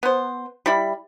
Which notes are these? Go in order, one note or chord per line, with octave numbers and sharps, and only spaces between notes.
B3 C5
G3 E4 B5